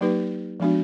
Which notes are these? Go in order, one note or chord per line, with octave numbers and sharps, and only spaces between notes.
F#3 A#3 D#4 G4 B4
F3 G#3 B3 D4 F#4